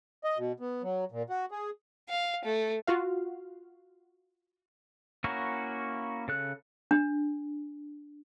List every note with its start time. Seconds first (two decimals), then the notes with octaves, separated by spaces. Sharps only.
0.24 D#5
0.38 B2
0.60 B3
0.83 F#3
1.12 A#2
1.30 F#4
1.51 G#4
2.09 F5
2.45 A3
2.87 F4 F#4 F5
5.24 A#3 C#4 E4 F#4 A#4
6.28 C#3 A4 F#6
6.91 D4